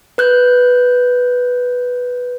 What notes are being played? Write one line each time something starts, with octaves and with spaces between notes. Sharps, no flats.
B4 F#6 G6